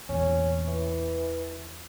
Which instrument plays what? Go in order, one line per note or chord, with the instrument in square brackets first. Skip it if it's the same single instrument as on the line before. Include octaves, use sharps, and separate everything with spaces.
[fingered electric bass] E2 A#2 [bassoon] C#4
[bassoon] E3